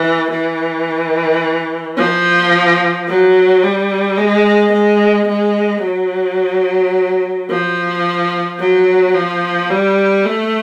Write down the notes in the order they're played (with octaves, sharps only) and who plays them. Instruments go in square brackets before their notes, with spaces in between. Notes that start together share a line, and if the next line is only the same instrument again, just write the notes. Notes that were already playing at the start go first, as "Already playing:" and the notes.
Already playing: [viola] E3
E3
F3
F#3
G3
G#3
G#3
G#3
F#3
F3
F#3
F3
G3
A3